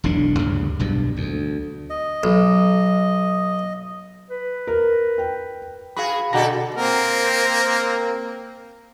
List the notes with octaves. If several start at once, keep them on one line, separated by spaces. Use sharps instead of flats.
E1 B1 A2 D4
D2 G2 C#3
B1 G2 B2
D2
D#5
B1
B4
A#4
G5
F#4 G#4 F5 B5
B2 D3 G4 A4 F#5 A#5 A#6
A#3 C4 A#4